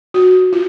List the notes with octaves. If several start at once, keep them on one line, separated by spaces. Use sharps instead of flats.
F#4
F4